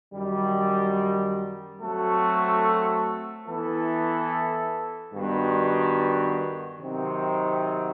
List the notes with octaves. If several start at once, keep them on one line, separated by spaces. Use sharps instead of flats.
F#2 D#3 G3
F#3 A3 C4 F#4 A4
E3 B3 E4 A4
G2 D#3 G3 B3 F#4
C3 D#3 F#3 C4 D#4